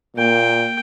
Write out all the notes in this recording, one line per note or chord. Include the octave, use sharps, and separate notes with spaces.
A#2 A#3 G5